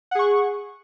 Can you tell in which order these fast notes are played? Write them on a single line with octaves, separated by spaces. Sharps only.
F#5 G#4 C#6